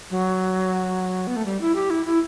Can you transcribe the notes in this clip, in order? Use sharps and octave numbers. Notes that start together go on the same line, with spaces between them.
F#3
B3
A3
G3
E4
G4
E4
E4